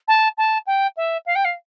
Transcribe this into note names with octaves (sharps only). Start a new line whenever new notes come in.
A5
A5
G5
E5
F5
G5
F5